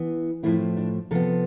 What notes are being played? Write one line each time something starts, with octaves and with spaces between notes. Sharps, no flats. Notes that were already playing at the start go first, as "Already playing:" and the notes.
Already playing: E3 B3
A2 F3 A3 C4 E4
D4
C3 F3 B3 A4